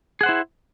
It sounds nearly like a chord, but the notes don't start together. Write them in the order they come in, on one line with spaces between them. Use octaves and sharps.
G#4 F#5 C5 E4